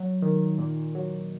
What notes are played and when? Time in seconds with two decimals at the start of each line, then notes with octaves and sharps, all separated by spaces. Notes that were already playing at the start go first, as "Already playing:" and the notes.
Already playing: F#3
0.22 D#3
0.58 A#2
0.95 F#3